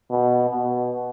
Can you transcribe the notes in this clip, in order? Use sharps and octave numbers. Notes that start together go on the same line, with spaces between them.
B2
B2